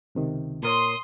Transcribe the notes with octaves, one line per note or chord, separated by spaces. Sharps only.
C#2 C3 D#3
A#2 A#4 C#5 C6 D#6